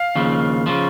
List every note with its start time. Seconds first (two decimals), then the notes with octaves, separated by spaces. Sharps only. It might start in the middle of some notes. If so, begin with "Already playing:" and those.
Already playing: F5
0.15 D#2 C#3 F3
0.66 C#3 F3